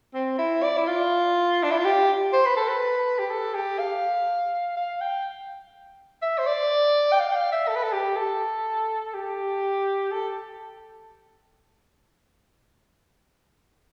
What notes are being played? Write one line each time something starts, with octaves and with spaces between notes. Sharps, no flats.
C4
E4
D5
E4
F4
D4
E4
F4
G4
C5
B4
A4
B4
G4
A4
G4
F5
F5
G5
E5
C5
D5
G5
F5
G5
F5
E5
A4
B4
A4
G4
A4
G4
A4